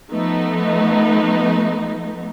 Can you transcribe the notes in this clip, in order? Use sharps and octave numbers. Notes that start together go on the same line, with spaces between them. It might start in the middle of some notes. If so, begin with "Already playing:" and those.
F3 A3 B3 D#4